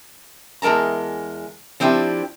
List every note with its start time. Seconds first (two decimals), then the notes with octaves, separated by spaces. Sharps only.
0.62 E2 G#3 A#4 A5 A#5
1.80 F3 C4 D4 E4 G4